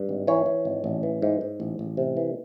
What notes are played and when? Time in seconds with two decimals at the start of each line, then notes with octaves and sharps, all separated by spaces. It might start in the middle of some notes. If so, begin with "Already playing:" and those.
Already playing: G2
0.09 G#1
0.27 E3 C#5
0.46 E3
0.65 G#1
0.84 A1
1.03 E3
1.22 G#2
1.41 G#2
1.60 A1
1.79 A1
1.97 C3
2.17 E3